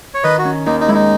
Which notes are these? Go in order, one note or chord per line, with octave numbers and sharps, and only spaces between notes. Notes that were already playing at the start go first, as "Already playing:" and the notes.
C#5
D#3 B4 D#5
F#4
C#4
D#2 D#4
D#4
G#3 E4
D#4